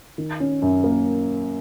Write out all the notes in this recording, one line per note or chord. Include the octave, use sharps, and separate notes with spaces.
D#3
C#4
F#2
A#3